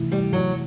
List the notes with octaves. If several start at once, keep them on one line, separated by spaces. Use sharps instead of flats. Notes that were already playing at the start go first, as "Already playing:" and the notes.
Already playing: C3 E3 A3 E4
G3
F#3